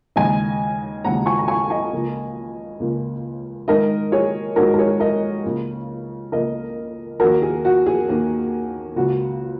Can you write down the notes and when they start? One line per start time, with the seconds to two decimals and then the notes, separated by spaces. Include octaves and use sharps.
0.16 D#2 C#3 G#3 D#5 G#5
1.05 D#2 C#3 G#3 F#5 A#5
1.26 G#5 C#6
1.39 A#5
1.48 G#5 C#6
1.70 D#5 G#5
1.93 C#2 C#3 A#3
2.80 C#2 C#3 A#3
3.68 G#2 D#3 G#3 A#4 D#5
4.12 G#4 C#5
4.56 G#2 D#3 G#3 F#4 A#4
4.74 A#4
4.78 G#4 C#5
5.00 A#4 D#5
5.45 C#2 C#3 A#3
6.32 C#2 C#3 A#3 A#4 D#5
7.20 D#2 D#3 A#3 F#4 A#4
7.42 G#4
7.65 F#4
7.86 G#4
8.08 D#2 D#3 A#3
8.96 C#2 C#3 A#3 F#4